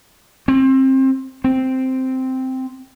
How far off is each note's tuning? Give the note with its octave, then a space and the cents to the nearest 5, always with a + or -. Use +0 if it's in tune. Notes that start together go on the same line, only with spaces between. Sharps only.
C4 +25
C4 -5